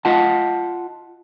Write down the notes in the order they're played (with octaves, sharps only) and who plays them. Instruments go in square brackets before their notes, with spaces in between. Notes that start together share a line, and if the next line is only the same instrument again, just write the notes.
[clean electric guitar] F4 D#5 F#5 A5